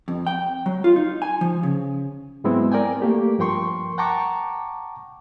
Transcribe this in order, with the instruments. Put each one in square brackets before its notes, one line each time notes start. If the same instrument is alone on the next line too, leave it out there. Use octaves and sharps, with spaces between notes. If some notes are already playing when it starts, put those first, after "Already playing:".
[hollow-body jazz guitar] F2
G5
F#3
F4
D#4
G#5
F3
C#3
[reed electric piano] G#2 F#3 G#3 B3 C4 E4
A#4 D5 G5 G#5
A3 A#3 G4
G2 F3 A#4 G5 C6 C#6
F#5 G5 A5 A#5 C#6 D6